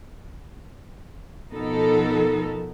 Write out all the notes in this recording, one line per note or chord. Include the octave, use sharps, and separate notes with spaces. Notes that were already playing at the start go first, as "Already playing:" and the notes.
B2 F3 B3 D#4 A4 A#4